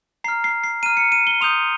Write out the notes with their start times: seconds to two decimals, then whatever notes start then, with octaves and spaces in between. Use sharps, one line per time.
0.24 A#5 C7
0.28 F6
0.44 C7
0.64 C7
0.83 A#5 F6 D#7
0.97 C#7
1.12 D#7
1.27 G7
1.41 C6 D#6 G6 F7